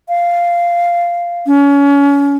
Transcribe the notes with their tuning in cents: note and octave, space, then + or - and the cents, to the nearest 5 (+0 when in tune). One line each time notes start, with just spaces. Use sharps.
F5 -10
C#4 +30